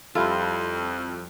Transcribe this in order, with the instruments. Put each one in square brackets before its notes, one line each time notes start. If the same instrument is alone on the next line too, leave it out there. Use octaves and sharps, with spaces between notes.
[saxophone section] F2 [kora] G3 E4 A4 [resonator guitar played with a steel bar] F4